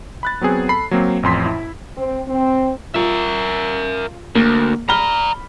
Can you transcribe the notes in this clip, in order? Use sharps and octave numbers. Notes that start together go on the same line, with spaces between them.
B5 F#6 A6
F#3 B3 C4 G#4
A4 B5 C7
F#3 A#3 C4
A1 F2 C6 B6
E4
C4
C4
F4 A#4 E5
D2 A#3
D5 A#5 B5 F6 G7